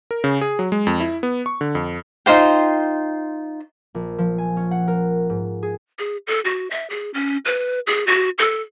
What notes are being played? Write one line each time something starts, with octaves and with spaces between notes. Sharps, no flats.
A#4
C#3
G#4
F#3
G#3
F2
E4
B3
C#6
D3
F2
D#4 F4 C5 G5
A#1
F3
G#5
C#4
F#5
A#4
G#2
G#4
G#4
A4
F#4
E5
G#4
C#4
B4
G#4
F#4
A4